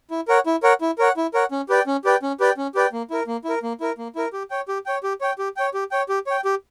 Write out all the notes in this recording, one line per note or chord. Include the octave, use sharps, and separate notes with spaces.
E4
A#4 C#5 F#5
E4
A#4 C#5 F#5
E4
A#4 C#5 F#5
E4
A#4 C#5 F#5
C#4
G4 B4 D5 G5
C#4
G4 B4 D5 G5
C#4
G4 B4 D5 G5
C#4
G4 B4 D5 G5
A#3
E4 A#4
A#3
E4 A#4
A#3
E4 A#4
A#3
E4 A#4
G4
C#5 G5
G4
C#5 G5
G4
C#5 G5
G4
C#5 G5
G4
C#5 G5
G4
C#5 G5
G4